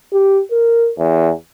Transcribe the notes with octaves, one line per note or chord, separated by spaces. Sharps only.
G4
A#4
E2